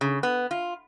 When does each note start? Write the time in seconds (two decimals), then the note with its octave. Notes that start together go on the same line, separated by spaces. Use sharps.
0.01 C#3
0.23 B3
0.51 F4